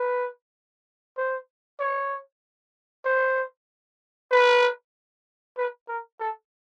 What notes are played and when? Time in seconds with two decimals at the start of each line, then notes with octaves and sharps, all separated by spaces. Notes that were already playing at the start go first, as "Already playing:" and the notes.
Already playing: B4
1.17 C5
1.80 C#5
3.05 C5
4.31 B4
5.57 B4
5.88 A#4
6.20 A4